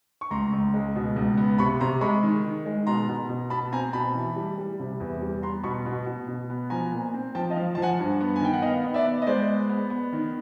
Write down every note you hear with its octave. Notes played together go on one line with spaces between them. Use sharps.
C#6
C#2 A#5 C6
C#2
G#3
B2
C#2
B3
C3 B5 C#6
C3 A#5 C6
G#3 B5 C#6
D#3
D#3
G#3
B2 A#5 C6
B2
B2
B2 A5 B5
C4 G#5 A#5
B2 A5 B5
E3
G3
G3
C3
E2
G3
B3 A#5 C6
B2 B5 C#6
B2
B2
B2
B3
F3 G#5 A#5
A#2
C4
F3 G5 A5
D#5 F5
F3
F3 A5
F#5 G#5
G2
B3
G#5
D#3 G5
F#5
B3 D#5 F5
B3
D5 E5
B3
D#5
G#3 C5 D5
B3
B3
B3
D#3